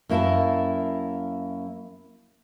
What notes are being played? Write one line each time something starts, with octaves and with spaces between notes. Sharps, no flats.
F#2 A#3 E4 G#4 A#4 A5